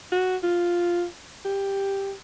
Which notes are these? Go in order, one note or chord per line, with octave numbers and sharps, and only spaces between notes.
F#4
F4
G4